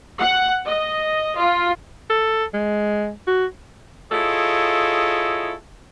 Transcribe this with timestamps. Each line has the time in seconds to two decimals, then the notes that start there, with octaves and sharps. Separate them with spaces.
0.18 F#5
0.66 D#5
1.38 F4
2.10 A4
2.54 G#3
3.27 F#4
4.12 E4 F4 G#4 A4 C#5 D#5